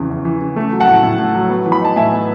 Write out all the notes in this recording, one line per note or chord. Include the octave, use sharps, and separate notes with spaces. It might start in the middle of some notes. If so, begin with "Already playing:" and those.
Already playing: E2 C#3 E3
E2
E3
C#3
A3
F#3
F#5 A5
A2
A2
A3
F#3
B3
E3
B5
D#4 A5
A2 E5 G#5
B3